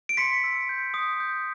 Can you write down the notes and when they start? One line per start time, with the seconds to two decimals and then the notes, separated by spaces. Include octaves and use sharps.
0.09 D7
0.17 C6 B6 C#7
0.44 E6
0.69 G6
0.94 D#6
1.20 G6